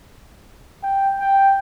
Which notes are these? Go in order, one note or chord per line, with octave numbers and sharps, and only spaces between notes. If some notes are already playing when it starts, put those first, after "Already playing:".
G5
G5